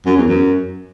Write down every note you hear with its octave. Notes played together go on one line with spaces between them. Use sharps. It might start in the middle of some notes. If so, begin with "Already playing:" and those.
F#2
E2
F#2